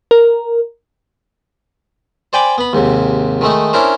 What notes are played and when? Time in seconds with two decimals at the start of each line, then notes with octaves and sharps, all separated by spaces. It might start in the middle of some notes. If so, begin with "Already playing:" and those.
0.11 A#4
2.33 C5 D5 G5 G#5 B5 D6
2.58 B3 B5
2.73 D#2 G#2 C3
3.41 D#3 G#3 A3 D#4
3.73 C#4 D4 E4 A#4 C5